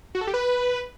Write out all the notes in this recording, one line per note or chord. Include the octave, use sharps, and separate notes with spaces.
F#4
A4
G4
B4